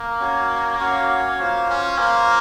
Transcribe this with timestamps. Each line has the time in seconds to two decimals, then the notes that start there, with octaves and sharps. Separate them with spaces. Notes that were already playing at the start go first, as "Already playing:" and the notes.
Already playing: A#3
0.20 C#4 F#4 C#5 F5
0.80 C#4 F#4 C#5 F5
1.39 A#3 F4 C5 F5
1.69 C#4
1.98 A#3 F4 C5 F5